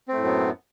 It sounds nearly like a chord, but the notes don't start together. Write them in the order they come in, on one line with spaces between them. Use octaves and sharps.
C4 A3 A2 F#2 B3